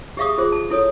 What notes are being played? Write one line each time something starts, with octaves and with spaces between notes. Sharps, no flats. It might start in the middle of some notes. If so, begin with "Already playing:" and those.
G4 G#4 E5 F5 C#6 D#6
F4 G#4 C5
A5
E4 A4 C#5 D#6